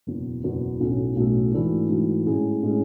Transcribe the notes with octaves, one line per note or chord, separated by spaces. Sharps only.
F#1 E2 B2
F#1 E2 B2
B1 A2 F#3 A3 C#4
B1 A2 F#3 A3 C#4
G#2 E3 A3 D4 F#4
G#2 E3 A3 D4 F#4
A2 G#3 C#4 E4 G#4
A2 G#3 C#4 E4 G#4